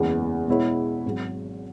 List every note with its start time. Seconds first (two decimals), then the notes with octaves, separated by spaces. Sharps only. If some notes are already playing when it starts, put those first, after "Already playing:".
Already playing: F#1 E2 E3 G#3 B3
0.48 B2 G#3 B3 E4 C#5
1.05 G#1 G#2 F#3